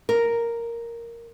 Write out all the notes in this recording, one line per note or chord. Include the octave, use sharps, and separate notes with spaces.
A#4